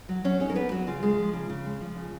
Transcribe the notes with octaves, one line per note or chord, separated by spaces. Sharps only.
F#3
F#3 C#4 C#5
C#4 D#4 C#5
A#4
A#3 B3 B4
F#3 F#4
C#3 F4
G#3
F3
C#3
C#3
G#3
F3
C#3